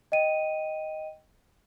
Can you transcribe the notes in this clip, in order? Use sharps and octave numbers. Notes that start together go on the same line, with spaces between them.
D#5 G5 D#7